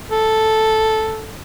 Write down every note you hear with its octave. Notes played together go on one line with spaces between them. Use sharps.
A4